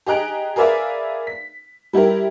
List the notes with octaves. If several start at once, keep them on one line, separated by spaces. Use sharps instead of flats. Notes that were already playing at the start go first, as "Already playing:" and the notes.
G4 G#4 D#5 A#5 F#6 D7
G#4 A#4 B4 D5 E5 F5
B6
G3 E4 G4 A#4